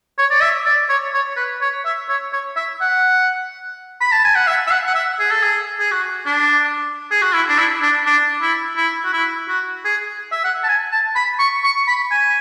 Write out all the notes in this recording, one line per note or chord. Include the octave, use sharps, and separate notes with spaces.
C#5
D5
E5
D5
C#5
C#5
B4
C#5
E5
C#5
C#5
E5
F#5
B5
A5
G#5
F#5
E5
E5
F#5
F#5
E5
G#4
A4
G#4
G#4
F#4
D4
G#4
F#4
E4
D4
E4
D4
D4
E4
E4
F#4
E4
F#4
G#4
E5
F#5
A5
G#5
A5
B5
C#6
C#6
B5
G#5